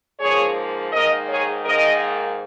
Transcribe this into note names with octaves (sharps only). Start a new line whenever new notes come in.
G#2 F3 A#3 G#4 C#5
G#2 D#3 A#3 A#4 D#5
G#4 C#5
G#2 D#3 A#3 A#4 D#5